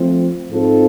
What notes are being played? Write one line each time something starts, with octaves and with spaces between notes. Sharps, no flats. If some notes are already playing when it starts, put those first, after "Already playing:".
Already playing: F3 A3 C4
G#2 G#3 C4 F4 A4